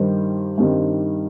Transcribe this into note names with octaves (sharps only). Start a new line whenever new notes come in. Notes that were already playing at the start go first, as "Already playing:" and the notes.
Already playing: G2 D#3 G3 D#4 C5
G2 D#3 G3 C4 D#4